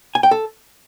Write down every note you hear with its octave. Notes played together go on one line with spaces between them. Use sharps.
G#5
G5
A4